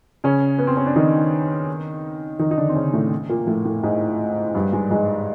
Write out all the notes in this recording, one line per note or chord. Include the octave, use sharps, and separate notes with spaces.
C#3 C#4
B3
C4
C#4
D4
D#3 D#4
D#3 D#4
D#4
D3 D4
C4
C#3 C#4
A2 A3
A#2 A#3
A2 A3
A2 A3
G#2 G#3
G2 G3
G#2 G#3
G#2 G#3